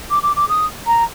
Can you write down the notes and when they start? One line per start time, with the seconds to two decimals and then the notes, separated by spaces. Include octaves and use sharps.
0.11 D6
0.23 D6
0.36 D6
0.49 D#6
0.87 A#5